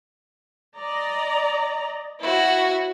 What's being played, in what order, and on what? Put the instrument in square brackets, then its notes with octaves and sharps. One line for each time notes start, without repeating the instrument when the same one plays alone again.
[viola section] D5 D#5 A#5
[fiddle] E4 F#4 [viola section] C#5